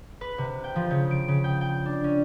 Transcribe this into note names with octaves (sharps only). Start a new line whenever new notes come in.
B4
C3
G5
F3
C#3
D7
C#3
G5
G5
D4
C#4